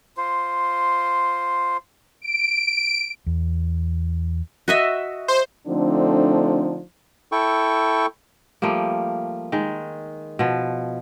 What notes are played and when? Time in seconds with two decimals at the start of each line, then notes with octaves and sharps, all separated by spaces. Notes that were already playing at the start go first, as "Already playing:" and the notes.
0.17 F4 C5
2.22 D7
3.26 E2
4.68 F#4 D#5 E5
5.28 C5
5.67 D3 F3 A3 C4 D4 D#4
7.32 E4 A4 G5 C#6
8.62 F3 G3 A3 A#3
9.52 D#3 G#3
10.39 B2 F3